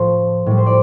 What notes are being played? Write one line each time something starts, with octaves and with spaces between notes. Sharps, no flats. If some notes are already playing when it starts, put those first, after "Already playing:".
Already playing: A2 F3 A4 C5 A5
A2 G3
C5
D5